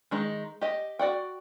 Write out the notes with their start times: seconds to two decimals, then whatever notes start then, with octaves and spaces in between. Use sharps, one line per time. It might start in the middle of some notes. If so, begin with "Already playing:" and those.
0.11 D#3 G#3 D#4
0.61 G4 D#5
0.99 F#4 D5 F#5 G5